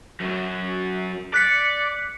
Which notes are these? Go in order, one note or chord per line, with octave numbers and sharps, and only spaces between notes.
F#2 F#3
D5 F#6 B6 C#7